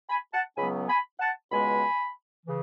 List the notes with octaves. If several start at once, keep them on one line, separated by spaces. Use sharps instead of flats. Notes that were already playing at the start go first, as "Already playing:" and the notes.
G#5 B5
F#5 A5
C#2 C#3 F#3 B3 G#5 B5
G#5 B5
F#5 A5
C#2 B2 G#3 B3 G#5 B5
C#3 E3